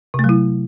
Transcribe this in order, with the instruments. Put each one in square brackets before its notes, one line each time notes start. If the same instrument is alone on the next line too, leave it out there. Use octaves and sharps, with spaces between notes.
[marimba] C3
A3
F#3
E4